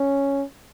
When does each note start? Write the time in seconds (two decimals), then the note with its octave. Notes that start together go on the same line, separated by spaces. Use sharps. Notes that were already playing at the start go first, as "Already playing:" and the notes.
Already playing: C#4